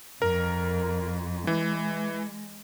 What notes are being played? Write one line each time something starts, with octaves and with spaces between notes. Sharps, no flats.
F2 A#4
E3 G#3